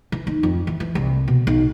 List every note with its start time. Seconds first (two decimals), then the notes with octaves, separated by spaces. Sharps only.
0.12 E3
0.27 D#4
0.43 F2
0.67 E3
0.80 E3
0.95 C2
1.28 B2
1.47 B1